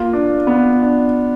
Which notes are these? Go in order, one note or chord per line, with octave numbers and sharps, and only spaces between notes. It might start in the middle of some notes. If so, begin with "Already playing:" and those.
Already playing: A#3 F4
D4
B3 F4
D4